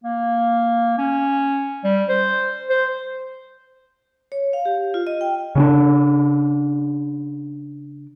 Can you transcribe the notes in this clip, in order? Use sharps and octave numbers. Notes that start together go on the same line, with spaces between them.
A#3
C#4
G3
C5
C5
C#5
F5
G4
F4
D#5
G5
C#3 C#4 D4